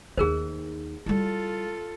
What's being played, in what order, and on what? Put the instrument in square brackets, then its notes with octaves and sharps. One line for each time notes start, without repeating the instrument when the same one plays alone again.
[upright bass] D#2 D#4 [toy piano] G#4 A#4 C5
[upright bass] G3 E4 [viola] F4 A4